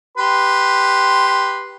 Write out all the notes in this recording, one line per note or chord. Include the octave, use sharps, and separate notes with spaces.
G4 B4 C6